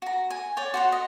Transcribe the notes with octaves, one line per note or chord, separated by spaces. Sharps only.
F#4 A#5
G#5
C#5 D5 G5
F#4 C5 F#5
D#5